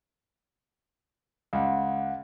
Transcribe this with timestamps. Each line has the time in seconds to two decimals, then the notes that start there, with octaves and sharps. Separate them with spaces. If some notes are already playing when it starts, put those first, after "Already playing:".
1.53 C#2 F5 F#5